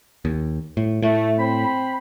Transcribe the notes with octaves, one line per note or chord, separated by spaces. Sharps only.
D#2
A2
A2 A3
C4 C5 B5